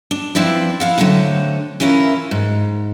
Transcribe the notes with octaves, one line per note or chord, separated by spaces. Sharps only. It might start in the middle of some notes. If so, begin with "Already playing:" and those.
D4
F3 C4 E4 B4 D5
E4 F5 F#5
D3 F#3 A3 C4 D#4
E3 C#4 E4 F4 A#4
G#2